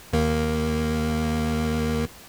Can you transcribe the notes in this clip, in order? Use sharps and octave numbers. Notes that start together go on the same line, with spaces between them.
D#2 A#3